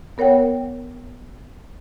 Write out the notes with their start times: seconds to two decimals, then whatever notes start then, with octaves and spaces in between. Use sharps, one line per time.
0.18 B3 A#4 C#5 F#5 G5